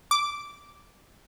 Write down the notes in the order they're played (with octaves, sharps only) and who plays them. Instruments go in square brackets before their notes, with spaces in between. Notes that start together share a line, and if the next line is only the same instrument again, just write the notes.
[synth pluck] D6